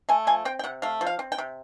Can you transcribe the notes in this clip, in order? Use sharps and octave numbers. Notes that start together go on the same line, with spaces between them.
A3 G#5
F3 G#5
C4 G5
G5
C3 F#5
A3 F5
F3
F5
C4
G5
C3